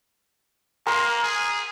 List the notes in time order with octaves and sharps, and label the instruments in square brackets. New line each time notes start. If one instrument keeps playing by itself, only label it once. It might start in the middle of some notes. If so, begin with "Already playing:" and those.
[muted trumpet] A#3 [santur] A#4 C6 E6
[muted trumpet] G#4